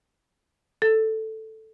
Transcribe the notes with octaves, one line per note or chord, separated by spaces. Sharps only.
A4